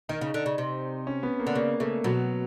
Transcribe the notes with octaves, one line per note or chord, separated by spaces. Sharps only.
D#3 D#4
C#3
D3
C#3
C3
C#4
B3
A#3
D3
C#3 A#3
C#3 A3
B2 F#3